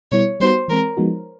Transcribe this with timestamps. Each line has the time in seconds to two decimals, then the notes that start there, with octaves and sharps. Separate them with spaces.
0.12 B2 G3 B3 E4 C#5
0.40 G3 B3 D#4 F#4 C5
0.68 E3 G#3 C4 A#4
0.97 F3 G#3 B3 D#4 F#4